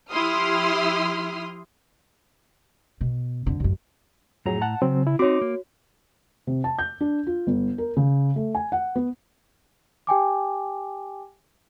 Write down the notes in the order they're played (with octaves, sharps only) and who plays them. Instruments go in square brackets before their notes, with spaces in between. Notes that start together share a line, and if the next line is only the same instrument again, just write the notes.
[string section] F3 E4 G4 C6 D#6 F6
[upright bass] B2
F2 D3
A1 F#2
[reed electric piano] F2 F#3 G#4 [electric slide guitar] A2 A#5
[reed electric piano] F#5 A5
[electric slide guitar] C#3 [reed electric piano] F#3 C4
[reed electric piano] E4
[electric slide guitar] C4 D#4 [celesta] F#4 C#5 [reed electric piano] D6
[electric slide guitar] A#3
[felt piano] C3
A5
G6
D4
F4
G1
A#4
C#3
A3
G#5
F#5
B3
[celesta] G4 G5 G#5 D6